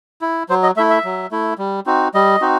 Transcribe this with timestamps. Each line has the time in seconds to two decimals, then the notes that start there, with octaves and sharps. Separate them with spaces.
0.21 E4
0.49 F#3 C5
0.63 D#5
0.77 A3 E4 E5
0.90 E5
1.05 F#3
1.31 A3 E4
1.58 G3
1.86 C4 D#4 F#4
2.14 G3 D#5
2.41 C4 D#4 F#4